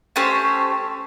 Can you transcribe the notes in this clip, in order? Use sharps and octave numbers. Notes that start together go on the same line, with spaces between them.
A3 C#4 G4 C5